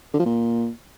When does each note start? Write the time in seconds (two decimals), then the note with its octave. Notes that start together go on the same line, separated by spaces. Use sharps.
0.14 D3
0.19 F3
0.25 A#2